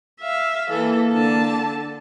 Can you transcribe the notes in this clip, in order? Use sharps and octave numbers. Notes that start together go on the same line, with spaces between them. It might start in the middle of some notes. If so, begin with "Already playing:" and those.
E5 F5
E3 A#3 A4
D3 A5